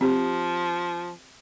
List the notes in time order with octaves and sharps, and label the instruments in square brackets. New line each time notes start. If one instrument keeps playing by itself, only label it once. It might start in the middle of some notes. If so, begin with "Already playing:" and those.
[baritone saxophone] F3 [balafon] C4 G4